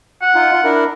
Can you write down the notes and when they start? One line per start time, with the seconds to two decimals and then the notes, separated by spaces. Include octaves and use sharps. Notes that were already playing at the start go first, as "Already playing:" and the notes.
0.22 F#5
0.35 D#4 F4
0.52 F4
0.64 D4 E4 A#4